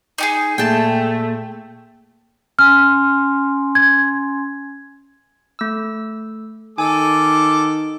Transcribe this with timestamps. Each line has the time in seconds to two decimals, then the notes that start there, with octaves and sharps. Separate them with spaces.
0.18 D#4 G4 G#4
0.58 A#2 A3 G#4 G5 A5
2.59 C#4 G#5 C6 F6
3.75 G#6
5.59 A3 E6
6.78 D#3 A4 G#5 D6